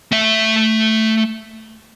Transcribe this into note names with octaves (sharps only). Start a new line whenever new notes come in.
A3 E5